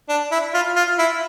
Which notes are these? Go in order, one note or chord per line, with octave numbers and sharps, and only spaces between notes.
D4
E4
F4
F4
E4